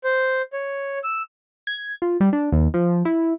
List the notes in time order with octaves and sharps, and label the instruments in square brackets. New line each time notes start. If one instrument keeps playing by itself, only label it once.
[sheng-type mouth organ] C5
C#5
E6
[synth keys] G#6
F4
G3
D4
D#2
F3
E4